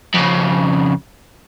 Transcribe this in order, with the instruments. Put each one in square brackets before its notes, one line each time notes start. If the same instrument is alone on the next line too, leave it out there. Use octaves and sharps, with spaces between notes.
[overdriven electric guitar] F2 C#3